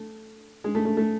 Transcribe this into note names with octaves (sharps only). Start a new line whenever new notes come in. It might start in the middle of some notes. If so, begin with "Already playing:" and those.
Already playing: A3
G#3
A3
A3
A3